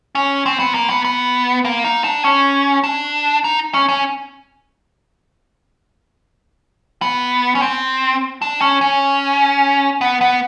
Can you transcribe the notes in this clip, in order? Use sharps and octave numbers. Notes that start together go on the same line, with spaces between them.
C#4
C4
B3
A#3
B3
B3
A#3
D#4
D4
C#4
D4
D#4
C#4
C#4
B3
C#4
C4
D4
C#4
C#4
B3
B3